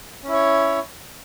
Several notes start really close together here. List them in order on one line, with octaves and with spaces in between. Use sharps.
C#4 E4 C#5